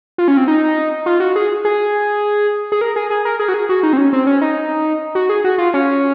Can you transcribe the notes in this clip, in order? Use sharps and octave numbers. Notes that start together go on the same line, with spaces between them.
F4
C#4
C4
D#4
F4
F#4
G#4
G#4
G#4
A#4
G#4
G#4
A#4
G#4
F#4
G#4
F#4
D#4
C4
C#4
C4
C#4
D#4
F#4
G#4
F#4
F4
C#4